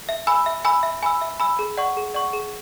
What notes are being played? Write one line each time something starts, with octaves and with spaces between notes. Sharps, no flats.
E5
G#5 B5 E6
E5
G#5 B5 E6
E5
G#5 B5 E6
E5
G#5 B5 E6
G#4
D5 F#5 C#6
G#4
D5 F#5 C#6
G#4